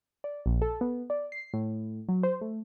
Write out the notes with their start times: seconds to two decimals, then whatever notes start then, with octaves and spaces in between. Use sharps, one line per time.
0.24 D5
0.46 A#1
0.62 A4
0.81 B3
1.10 D5
1.32 C7
1.54 A2
2.08 F#3
2.23 C5
2.41 A3